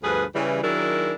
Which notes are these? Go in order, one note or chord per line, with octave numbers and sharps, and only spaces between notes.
D2 G2 F3 G#4 B4
C#3 E3 G3
D#3 F#3 D4 E4 G#4 A#4